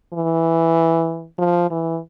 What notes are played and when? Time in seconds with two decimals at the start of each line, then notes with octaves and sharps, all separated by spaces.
0.13 E3
1.38 F3
1.71 E3